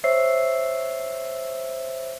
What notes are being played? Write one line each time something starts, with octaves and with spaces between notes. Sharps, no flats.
C5 C#5 E5 E6 C7